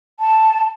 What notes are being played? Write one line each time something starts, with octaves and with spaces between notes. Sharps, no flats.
A5